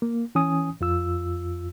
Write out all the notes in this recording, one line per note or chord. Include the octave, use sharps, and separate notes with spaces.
A#3
E3 C#4 G#5 D#6
F2 F4 E6